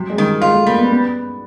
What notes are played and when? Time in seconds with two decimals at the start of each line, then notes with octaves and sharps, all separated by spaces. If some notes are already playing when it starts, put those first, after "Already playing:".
Already playing: C3 F#3
0.10 G#3
0.18 D#3 G3
0.41 G#3 F4
0.54 A3
0.66 G3 A#3
0.78 B3
0.90 B3